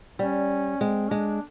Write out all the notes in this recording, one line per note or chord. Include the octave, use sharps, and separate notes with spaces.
G3 C#4
G#3 C4
G#3 D4